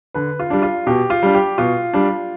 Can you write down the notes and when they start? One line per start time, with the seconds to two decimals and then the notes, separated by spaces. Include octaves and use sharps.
0.14 D3 B4
0.40 F4
0.50 G3 D4
0.62 F4
0.87 B2 G4
1.10 F4
1.23 G3 D4
1.35 G4
1.58 B2 F4
1.94 G3 D4